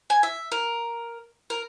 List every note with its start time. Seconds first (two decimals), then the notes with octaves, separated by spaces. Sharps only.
0.10 G#5
0.23 E5
0.52 A#4
1.50 A#4